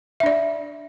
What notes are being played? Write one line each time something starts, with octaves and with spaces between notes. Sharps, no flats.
D4 D5 E5